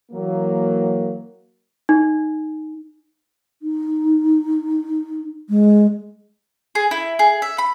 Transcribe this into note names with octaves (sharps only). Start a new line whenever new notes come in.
E3 F#3 A#3
D#4
D#4
G#3
G#4
E4
G#4
E5
B5